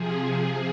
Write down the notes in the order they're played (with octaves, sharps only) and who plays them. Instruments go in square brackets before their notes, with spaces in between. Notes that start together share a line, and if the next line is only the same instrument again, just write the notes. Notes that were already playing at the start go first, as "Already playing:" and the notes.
Already playing: [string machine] C3 F3 G#4